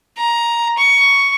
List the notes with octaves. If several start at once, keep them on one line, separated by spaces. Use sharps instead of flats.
A#5
C#6